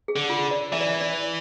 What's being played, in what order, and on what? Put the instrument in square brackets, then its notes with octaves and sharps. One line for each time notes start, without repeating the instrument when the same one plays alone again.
[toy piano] G#4
[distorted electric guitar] D3
[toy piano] F4
D5
[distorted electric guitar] E3 [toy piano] E5
[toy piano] D5
E5
D5